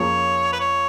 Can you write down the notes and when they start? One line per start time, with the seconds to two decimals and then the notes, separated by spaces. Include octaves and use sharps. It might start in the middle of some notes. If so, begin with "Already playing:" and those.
Already playing: F2 F3 A#3 C#4 G#4 C#5
0.53 B4
0.60 C#5